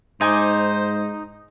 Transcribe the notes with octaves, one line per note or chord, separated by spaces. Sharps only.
G#2 D#4 C5 D#5 G#5 D6